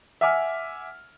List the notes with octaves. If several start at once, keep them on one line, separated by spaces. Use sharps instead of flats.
E5 F#5 G#5 D6 F6